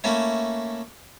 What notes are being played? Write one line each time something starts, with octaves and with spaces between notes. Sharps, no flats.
A3 A#3 C#4 E4